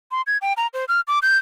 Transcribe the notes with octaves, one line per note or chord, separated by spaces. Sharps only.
C6
G#6
G5
A#5
C5
F6
D6
G6